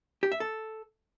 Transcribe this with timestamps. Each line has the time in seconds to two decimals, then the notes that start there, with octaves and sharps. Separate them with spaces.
0.23 G4
0.32 E5
0.40 A4